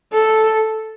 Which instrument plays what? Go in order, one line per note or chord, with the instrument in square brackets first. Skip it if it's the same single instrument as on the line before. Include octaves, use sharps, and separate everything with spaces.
[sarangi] A4